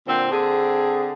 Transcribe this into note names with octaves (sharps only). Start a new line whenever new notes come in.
A#2 D3 C4
D3 C4 G#4